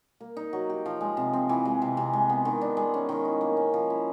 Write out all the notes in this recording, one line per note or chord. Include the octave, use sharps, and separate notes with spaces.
A#3
D#4
F#3
G4
F3
G#3
C3
C4
E3
G#3
C3
C3
G#3
B3
D#3
D4
G#3
C#4
D#3
E4
A#3
C#4
F3
E4